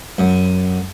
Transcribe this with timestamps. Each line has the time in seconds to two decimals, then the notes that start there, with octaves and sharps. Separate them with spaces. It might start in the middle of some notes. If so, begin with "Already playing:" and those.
0.18 F#2